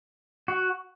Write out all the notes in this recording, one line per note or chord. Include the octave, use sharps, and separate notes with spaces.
F#4